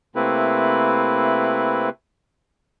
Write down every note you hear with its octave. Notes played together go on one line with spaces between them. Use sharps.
C3 A3 A#3 C4 E4 B4